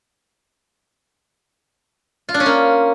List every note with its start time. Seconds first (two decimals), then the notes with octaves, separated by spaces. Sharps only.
2.29 F4
2.34 D4
2.40 C#4
2.46 A#3